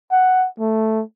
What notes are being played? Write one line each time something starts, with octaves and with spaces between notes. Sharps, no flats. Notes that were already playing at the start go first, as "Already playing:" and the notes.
F#5
A3